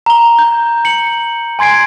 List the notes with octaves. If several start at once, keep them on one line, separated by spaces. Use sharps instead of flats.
A#5 G7
G6
C#7 F#7
G#5 C6 G#6 C7 D7